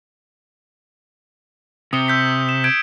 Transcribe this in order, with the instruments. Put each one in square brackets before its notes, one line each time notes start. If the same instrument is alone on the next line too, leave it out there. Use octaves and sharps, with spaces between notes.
[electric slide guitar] C3 [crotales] D#6 C#7 G7
[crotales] E6 G6 B6
E7
G6 G#6 D7